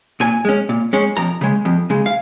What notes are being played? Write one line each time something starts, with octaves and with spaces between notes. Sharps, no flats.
A#2 G#5
G#3 C#4
A#2
G#3 C#4
F2 A#5
C#3 G#3
F2
C#3 G#3
F5